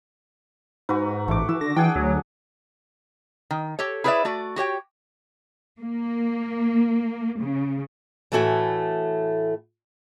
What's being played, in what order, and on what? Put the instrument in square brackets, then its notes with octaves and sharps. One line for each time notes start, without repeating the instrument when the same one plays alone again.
[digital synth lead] G#2 [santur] F#4 B4
[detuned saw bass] A1 [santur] A3 D6
[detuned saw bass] E3 [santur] E6
[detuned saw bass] D3 [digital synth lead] A#6
[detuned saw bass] E3 [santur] D4 G#4 F#5 [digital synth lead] G5
[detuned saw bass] D2 [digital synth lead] F#3
[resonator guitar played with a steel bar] D#3
G4 A4 C#5
E4 G#4 B4 C#5 D5 E5
A3 F#4 D5
F#4 G4 C#5 G5
[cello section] A#3
C#3
[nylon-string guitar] A2 E3 A3 F#4 G#5